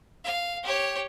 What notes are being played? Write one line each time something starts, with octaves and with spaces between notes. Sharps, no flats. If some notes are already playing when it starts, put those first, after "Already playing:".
F5
G4 C#5